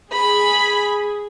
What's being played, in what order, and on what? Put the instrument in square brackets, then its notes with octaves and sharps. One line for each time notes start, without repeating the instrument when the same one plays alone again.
[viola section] G#4 [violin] B5